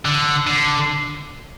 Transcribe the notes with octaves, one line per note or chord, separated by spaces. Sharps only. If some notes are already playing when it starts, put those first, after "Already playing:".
D3
D3